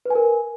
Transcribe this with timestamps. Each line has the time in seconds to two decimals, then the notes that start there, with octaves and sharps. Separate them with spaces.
0.05 B4
0.10 G#5
0.15 A#4